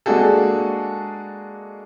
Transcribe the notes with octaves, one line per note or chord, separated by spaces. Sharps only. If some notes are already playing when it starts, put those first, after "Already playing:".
G#3 A#3 D4 F#4 G#4 A4